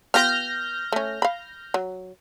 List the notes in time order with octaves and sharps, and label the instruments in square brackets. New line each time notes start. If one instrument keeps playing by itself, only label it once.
[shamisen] B3 F4 G4 [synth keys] F6 G6 A#6
[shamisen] A3 C#4
F5 B5
F#3